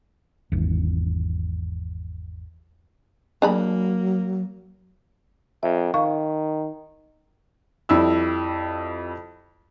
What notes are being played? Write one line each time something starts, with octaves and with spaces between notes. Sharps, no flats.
G#1 E2
F#3 A#3 D4 G#4 B5
F2 E5
D#3 F5 C#6
F2 G3 E4 E6